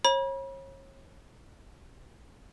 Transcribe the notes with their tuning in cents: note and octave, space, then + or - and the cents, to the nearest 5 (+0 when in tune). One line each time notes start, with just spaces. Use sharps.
C#5 -35 B5 -45